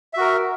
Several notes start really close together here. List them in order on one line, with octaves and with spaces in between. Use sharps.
E5 F#4 A#4